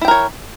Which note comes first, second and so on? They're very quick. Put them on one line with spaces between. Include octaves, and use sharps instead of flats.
E4 G5 A#4 C#5